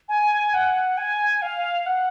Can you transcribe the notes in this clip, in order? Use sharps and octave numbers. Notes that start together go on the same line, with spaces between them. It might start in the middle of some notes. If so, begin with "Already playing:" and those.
G#5
F#5
G#5
F5
F#5